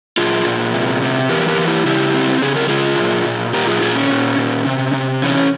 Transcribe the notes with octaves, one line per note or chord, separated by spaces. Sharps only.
A#2 F4 G#4
A#2
C3
C3
E3 G4 A#4
G4 A#4
E3
E4 G4
C#3 E4 G4
C4
C#3 G#4
A#4
C#3 F4 G#4
A#2
A#2
A#2 G4 A#4
F4 G#4
A#2 F4 G#4
C#4
A#2
A#2
C3
C3
E3 C#4